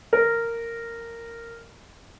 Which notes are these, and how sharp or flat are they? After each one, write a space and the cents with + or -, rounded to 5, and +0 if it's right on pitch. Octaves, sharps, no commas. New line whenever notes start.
A#4 -10